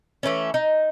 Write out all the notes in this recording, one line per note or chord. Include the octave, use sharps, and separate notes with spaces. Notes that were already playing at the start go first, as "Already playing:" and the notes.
E3 A3 B3 C#4
D#4